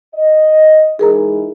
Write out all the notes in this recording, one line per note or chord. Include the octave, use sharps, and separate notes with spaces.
D#5
E3 G#3 D#4 G#4 A#4 A#5